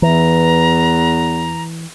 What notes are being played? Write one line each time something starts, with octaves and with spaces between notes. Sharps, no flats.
E2 E3 A#5